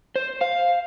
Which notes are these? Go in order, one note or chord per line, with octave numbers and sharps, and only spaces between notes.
C5
F5